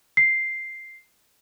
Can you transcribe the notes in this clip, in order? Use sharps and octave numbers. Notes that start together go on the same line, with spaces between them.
C7